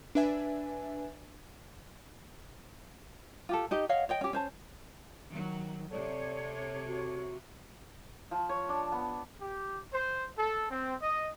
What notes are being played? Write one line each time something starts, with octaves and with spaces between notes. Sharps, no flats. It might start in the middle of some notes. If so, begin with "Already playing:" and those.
D4 B4 E5 G#5
F4 G4 A4
D#4 G4 D#5
C#5 D#5 F5 F#5
C#5 D#5 G5
C#4 G4
C#4 C5 A5
D#3 F#3
C3 A4 C#5 D5
F#4
F3
C#5
D4
B3
G4
C5
A4
C4
D#5